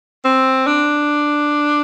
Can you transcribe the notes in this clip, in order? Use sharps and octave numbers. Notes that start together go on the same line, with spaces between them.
C4
D4